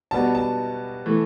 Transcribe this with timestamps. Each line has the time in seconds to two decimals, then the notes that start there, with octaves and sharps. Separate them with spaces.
0.11 B2 G3 B3 D4 F#4 A5
0.35 A5
1.06 E3 A3